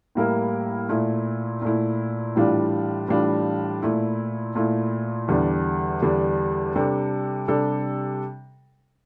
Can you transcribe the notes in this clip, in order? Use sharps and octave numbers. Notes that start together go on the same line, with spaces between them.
A2 G3 A#3 E4 A#4
A#2 A3 E4
A#2 A3 E4
A2 E3 G3 D4 F4
A2 E3 G3 D4 F4
A#2 A3 E4
A#2 A3 E4
E2 D3 G3 D4
E2 D3 G3 D4
C3 G3 D4 A4
C3 G3 D4 A4